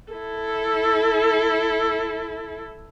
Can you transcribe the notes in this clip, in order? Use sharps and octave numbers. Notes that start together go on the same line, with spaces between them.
E4 A4